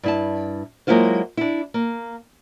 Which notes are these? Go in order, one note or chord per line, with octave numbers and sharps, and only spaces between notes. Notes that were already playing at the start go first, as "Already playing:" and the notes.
G2 E4 A5
F#3 G#3 A#3 E4 F4 C5
D4 E4
A#3